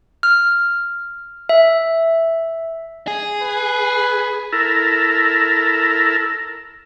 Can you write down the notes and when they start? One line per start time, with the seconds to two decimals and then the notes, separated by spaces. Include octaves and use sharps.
0.23 F6
1.49 E5
3.08 G#4
3.42 B4
4.52 E4 A4 A#4